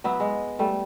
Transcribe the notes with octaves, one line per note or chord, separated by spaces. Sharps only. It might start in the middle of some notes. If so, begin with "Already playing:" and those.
F#3 B3 E5
G#3
G3 A3